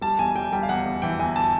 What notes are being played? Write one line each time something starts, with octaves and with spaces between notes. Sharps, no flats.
G3 A5
E2 G#5
G3 G5
G3 G5
F5
E2 F#5
E2
E3 G5
E2 G#5
A5